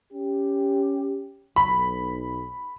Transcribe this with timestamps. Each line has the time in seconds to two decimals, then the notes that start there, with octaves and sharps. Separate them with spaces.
0.13 C#4 G4
1.56 B1 B5